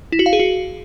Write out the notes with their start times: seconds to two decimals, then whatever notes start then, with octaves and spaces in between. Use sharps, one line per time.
0.12 E4
0.19 F#4
0.26 F5
0.33 G#4
0.40 F#4